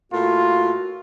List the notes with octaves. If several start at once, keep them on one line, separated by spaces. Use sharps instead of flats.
A2 A#3 F4 F#4